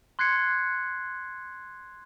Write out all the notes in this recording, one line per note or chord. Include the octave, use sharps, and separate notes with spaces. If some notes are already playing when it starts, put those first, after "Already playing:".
C6 F#6 G#6 C7 C#7